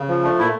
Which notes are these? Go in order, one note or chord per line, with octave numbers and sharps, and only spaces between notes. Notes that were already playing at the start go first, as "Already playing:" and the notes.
Already playing: C#3
F3
A3 D4
A#2 E4